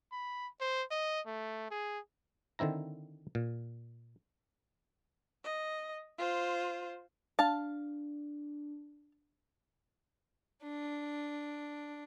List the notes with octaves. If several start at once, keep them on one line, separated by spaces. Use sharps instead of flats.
B5
C5
D#5
A3
G#4
D3 D#3 C4 E4 A#5
A#2
D#5
F4 C5
D4 F5 A5
D4